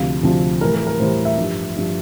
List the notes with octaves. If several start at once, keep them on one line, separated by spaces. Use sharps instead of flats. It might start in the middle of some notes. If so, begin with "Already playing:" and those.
Already playing: D2 C3 F3 F5
D2 C3 F3
A2 E3 G3 A#4
A#4
A#4
A2 E3 G3 C5
E5
G2 F3
G2 F3